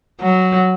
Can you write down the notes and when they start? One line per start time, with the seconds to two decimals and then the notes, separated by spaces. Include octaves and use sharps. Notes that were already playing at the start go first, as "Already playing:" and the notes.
0.20 F#3